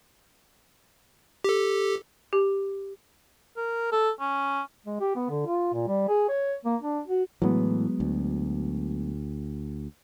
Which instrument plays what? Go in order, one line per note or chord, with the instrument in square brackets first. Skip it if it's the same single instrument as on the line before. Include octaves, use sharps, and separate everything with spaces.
[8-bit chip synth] G4 A4
[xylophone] G4
[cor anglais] A#4
A4
C#4
[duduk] G#3
G4
B3
D3
F4
A#2
G3
G#4
C#5
A#3
D4
F#4
[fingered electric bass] A2 E3 [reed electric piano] F#3 G#3 B3
[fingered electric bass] D2